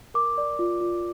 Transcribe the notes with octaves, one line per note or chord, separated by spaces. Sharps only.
A#4 D6
D5
F4
F4